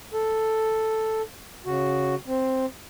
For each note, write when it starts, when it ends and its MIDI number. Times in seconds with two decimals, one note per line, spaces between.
0.13 1.22 69
1.66 2.15 49
1.66 2.15 66
2.28 2.66 60